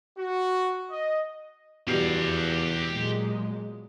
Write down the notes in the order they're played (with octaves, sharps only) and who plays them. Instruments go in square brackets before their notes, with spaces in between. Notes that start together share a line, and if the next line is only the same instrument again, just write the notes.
[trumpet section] F#4
D#5
[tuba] E2 [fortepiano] B2 G3 [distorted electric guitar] G4 F5
[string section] A#2 F#3 G#3